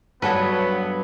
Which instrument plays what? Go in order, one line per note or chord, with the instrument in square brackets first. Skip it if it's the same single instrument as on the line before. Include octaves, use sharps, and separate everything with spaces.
[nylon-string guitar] G2 F#3 [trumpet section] B3 [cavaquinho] F#4 A4 C#5 [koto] B4